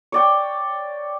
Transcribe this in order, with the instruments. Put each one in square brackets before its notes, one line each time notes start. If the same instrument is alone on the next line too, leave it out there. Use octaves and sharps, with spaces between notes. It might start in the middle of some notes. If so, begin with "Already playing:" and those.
[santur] C#5 D5 G5